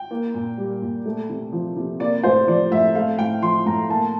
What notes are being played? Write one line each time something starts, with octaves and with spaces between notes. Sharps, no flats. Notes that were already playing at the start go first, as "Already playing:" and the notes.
Already playing: G5
A#3
A#2
G3
A#2
A3
C3
F3
C3
A#3 D5
A2 C5
F3 D5
A2 E5
A3 F5
A2 G5
F3 C6
A2 A#5
A#3 A5